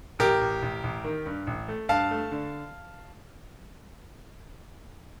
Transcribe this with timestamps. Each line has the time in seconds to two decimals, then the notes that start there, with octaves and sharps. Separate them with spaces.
0.19 A1 G4 A#4
0.41 A1
0.62 A1
0.83 A1
1.04 D#3
1.26 G2
1.47 A1
1.68 A3
1.89 G2 F5 A5
2.11 A3
2.32 D3